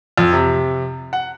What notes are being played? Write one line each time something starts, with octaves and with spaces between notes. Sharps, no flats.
F2
C3
F#5